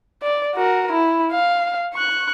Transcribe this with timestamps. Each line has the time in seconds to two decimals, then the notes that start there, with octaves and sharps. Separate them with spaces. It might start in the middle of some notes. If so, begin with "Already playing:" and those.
0.23 D5
0.55 F#4 A#4
0.92 E4
1.32 F5
1.94 C#6 F#6